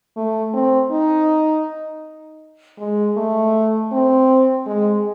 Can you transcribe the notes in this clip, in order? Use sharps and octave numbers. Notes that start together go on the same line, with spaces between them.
A3
C4
D#4
G#3
A3
C4
G#3